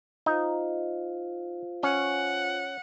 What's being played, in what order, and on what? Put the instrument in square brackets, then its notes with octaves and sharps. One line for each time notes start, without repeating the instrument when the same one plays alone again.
[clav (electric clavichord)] D#4 [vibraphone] F4 C5 F5
[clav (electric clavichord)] C#4 [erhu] F#5